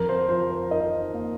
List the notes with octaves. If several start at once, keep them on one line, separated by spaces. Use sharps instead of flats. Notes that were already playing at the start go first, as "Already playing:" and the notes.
Already playing: F2 A#4
C5
F3 C5
C5
D#4 A#4 D#5
A#3